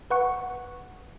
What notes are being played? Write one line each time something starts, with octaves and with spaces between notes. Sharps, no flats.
B4 F#5 C#6